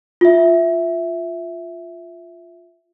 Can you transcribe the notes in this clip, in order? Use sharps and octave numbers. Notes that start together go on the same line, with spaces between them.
F4 E5